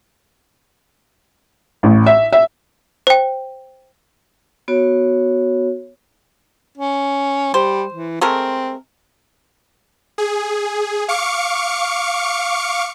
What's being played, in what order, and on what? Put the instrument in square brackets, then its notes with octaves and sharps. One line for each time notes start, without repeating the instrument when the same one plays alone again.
[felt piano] A1
E5
E5
[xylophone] C5 G5
[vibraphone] B3 F#4 C#5
[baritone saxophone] C#4
[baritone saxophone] G3 [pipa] C5
[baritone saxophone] E3
[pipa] G#3 A3 A#4 [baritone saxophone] C4
[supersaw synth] G#4
F5 C#6 D6 C#7